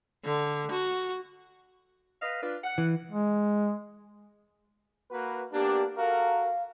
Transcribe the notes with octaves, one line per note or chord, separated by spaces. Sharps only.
D3
F#4
B4 D#5 F5
D4 F4 B4
F#5
E3
G#3
A#3 F#4 B4
A#3 B3 D4 G4
F#4 A4 A#4 F5